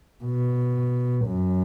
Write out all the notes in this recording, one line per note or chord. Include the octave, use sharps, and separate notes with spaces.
B2
F#2